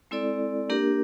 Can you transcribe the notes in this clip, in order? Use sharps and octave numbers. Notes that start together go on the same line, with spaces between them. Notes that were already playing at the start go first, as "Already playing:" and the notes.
G#3 C4 E4 A4 D5
A#3 D4 G4 A#4